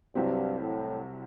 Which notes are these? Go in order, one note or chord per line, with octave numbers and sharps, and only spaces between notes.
C2 G2 C3 F#3 C4 G4
A2